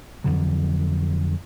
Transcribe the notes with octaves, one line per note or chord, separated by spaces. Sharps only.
F2 D3 E3 F#3